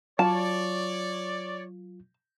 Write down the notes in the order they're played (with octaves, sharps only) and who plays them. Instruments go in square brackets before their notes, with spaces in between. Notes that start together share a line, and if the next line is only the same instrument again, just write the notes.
[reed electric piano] F#3 F4 [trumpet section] C#5 D5 [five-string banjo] A5